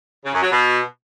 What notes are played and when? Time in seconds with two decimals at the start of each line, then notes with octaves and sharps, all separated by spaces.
0.25 C#3
0.34 F#2
0.42 F#3
0.51 B2